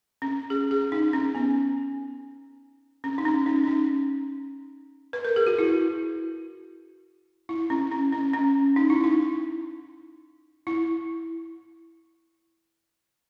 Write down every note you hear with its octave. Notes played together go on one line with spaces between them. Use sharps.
C#4
G#4
G#4
D#4
C#4
B3
C#4
D#4
C#4
D#4
C#4
D#4
B4
A#4
G#4
F#4
E4
E4
C#4
C#4
C#4
C#4
D#4
E4
D#4
E4